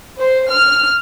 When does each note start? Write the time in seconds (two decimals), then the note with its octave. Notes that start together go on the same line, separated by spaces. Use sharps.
0.18 C5
0.50 F6